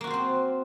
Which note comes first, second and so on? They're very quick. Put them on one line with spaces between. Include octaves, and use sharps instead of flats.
A#3 F#4 F4 C5 C4